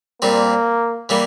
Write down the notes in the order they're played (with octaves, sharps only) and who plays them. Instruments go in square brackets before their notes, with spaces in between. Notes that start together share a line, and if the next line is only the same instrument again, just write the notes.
[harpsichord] A#2 G3 C4 [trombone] A#3
[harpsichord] E3 G3 A#3